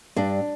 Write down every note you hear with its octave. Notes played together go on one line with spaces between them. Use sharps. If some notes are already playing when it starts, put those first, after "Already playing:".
G2 D4